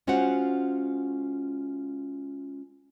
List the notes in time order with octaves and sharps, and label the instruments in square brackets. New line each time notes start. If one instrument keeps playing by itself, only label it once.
[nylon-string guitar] G#3 C#4 F4 F#4 C5 F#5